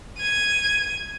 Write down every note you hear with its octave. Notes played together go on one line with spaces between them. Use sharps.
G#6 D#7